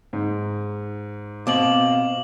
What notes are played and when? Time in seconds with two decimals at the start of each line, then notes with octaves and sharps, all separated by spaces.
0.13 G#2
1.47 B2 C4 F5 D6 F#7